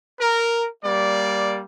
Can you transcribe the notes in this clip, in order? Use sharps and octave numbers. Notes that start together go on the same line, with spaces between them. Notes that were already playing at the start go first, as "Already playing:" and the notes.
A#4
G3 A#3 D5